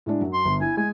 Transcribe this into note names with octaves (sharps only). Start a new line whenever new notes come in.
A2 G#3 D4
F#2 F#3
C6
G1
E4 G#5
G#3 G#5